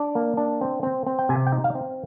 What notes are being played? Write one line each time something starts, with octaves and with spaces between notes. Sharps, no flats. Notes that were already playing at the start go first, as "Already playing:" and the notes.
Already playing: D4 D5
A#3
D4
C4
C4
C4
G5
C3 G#5
G5
D#4
F5
C4